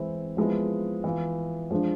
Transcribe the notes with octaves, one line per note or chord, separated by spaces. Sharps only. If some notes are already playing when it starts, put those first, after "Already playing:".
Already playing: E3 G#3 C4 E4
F3 G#3 B3 E4
E3 B3 F4
F3 G#3 D4